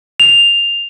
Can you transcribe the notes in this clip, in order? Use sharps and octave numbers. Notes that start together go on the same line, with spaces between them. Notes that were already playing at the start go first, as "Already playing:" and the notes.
F7